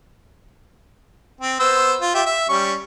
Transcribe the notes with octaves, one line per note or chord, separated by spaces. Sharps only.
C4
B3 C5 E6
F4
F4 G4 E5
E5
G3 C#4 C#6